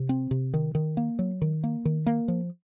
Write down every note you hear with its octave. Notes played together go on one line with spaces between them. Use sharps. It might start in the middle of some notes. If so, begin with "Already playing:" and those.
Already playing: C3
C4
C3
D#3
D#3
A#3
F#3
D#3
A#3
D#3
A#3
F3